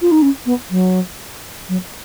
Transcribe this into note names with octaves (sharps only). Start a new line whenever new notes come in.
F4
D#4
C#4
B3
F#3
F#3